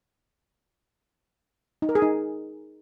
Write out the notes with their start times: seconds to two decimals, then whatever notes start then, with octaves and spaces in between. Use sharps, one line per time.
1.82 D#4
1.89 A#4
1.95 G#4
2.02 D#4